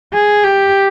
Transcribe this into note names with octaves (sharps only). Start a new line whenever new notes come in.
G#4
G4